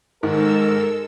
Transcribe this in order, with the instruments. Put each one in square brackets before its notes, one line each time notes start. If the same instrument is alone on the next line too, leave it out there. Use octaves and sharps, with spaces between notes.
[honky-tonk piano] G#2 D#3 [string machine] G#3 A4 E6 [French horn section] A#4